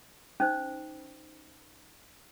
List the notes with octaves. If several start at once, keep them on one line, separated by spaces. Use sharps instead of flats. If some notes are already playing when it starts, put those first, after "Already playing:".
C#4 D#4 C5